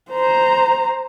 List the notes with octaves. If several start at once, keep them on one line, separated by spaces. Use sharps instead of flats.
C5 A#5